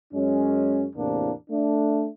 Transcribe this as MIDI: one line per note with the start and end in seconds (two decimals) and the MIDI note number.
0.14 0.85 42
0.14 0.85 56
0.14 0.85 61
0.96 1.32 40
0.96 1.32 45
0.96 1.32 48
0.96 1.32 58
0.96 1.32 62
1.50 2.07 57
1.50 2.07 62